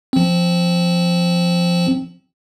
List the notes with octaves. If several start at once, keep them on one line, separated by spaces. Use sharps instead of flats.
F3 C4